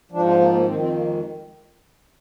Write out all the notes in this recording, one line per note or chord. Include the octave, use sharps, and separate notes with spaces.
G#2 F3 D4
C4
A#3
A#3
F2 D#3 C4
C4
A#3
G#3